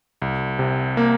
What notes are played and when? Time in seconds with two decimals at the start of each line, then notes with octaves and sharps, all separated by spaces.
0.22 C2
0.59 C3
0.97 A#3